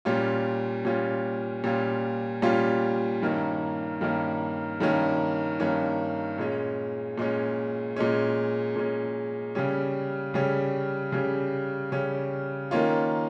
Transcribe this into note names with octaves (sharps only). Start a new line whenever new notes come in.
A#2 G3 C#4 F4
A#2 G3 C#4 F4
A#2 G3 C#4 F4
A#2 G3 C#4 F4
G2 D#3 A#3 C#4
G2 D#3 A#3 C#4
G2 D#3 A#3 C#4
G2 D#3 A#3 C#4
A#2 G#3 C#4
A#2 G#3 C#4
A#2 G#3 C#4
A#2 G#3 C#4
C#3 G3 C#4
C#3 G3 C#4
C#3 G3 C#4
C#3 G3 C#4
D#3 A#3 C#4 F4